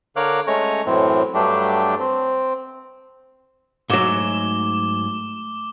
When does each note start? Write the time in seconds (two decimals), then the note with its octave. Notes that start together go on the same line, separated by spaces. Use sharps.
0.16 D3 A#4 C#5 F5 D6 F#6
0.47 G#3 A3 C#4 C#5 A#5 C#6
0.86 F#2 A2 E3 C4
1.34 G2 F#3 G3 A3 D4 G4
2.00 C4
3.90 G#2 F#3 A3 D6 E7 G7